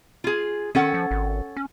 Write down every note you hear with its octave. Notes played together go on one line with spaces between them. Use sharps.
F4 G#4
D#3 C#4 A4 F#5
F3
G#1
C#4